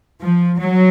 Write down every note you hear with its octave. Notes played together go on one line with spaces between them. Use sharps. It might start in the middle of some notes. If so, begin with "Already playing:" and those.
F3
F#3